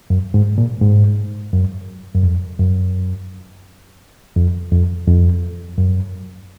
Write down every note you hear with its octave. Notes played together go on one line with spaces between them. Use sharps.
F#2
G#2
A#2
G#2
F#2
F#2
F2
F#2
F2
F2
F2
F#2